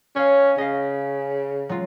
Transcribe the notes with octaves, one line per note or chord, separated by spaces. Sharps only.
C#4 C#5 F5
C#3 D#5 F5
F#3 G#3 F4